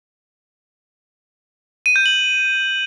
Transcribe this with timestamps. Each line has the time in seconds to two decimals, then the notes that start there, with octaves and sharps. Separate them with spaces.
1.86 D#7
1.96 G6
2.06 F#7